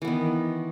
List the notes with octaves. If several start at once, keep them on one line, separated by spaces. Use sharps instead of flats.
D#3 E3 B3